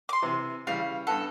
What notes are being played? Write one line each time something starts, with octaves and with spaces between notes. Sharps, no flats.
C6 D6
C3 E3
C#3 E3 G3 F5
G2 B3 A4 F#5